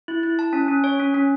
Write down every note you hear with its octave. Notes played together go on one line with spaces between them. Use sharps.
E4
E4
A5
C#4
C#4
C#5
C#4
C#4